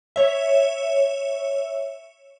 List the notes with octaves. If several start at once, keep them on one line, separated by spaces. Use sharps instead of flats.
C#5 E5